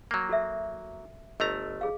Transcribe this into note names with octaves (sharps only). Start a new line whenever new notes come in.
F#3 A#3
F#4 A4 E5
G1 A3 D#5 A#5
G#4 F5